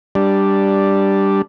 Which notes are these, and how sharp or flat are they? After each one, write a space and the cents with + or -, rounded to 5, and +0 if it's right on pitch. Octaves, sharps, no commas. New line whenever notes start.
G3 +0 D4 +0